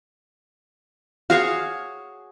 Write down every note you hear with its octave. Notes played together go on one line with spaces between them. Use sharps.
F#4 G#4 C#5 F5